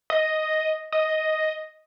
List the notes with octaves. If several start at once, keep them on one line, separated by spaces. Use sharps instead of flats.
D#5
D#5